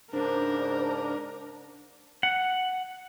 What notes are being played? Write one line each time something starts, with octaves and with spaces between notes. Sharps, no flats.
G#2 C#3 D4 A#4 C5
F#5